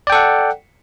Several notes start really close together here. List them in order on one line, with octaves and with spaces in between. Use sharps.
D5 G5 A4 F#5